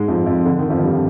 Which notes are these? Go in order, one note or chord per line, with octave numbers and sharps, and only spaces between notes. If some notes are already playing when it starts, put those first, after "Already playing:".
Already playing: G#2 G#3
F2 F3
F2 F3
D3
D#3
F2 F3
G2 G3